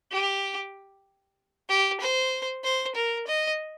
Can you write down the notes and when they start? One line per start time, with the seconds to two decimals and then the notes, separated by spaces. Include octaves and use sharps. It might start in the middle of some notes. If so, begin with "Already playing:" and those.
0.12 G4
1.69 G4
2.00 C5
2.64 C5
2.95 A#4
3.27 D#5